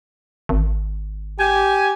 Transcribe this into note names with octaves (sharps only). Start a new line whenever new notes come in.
G#1
G4 G#5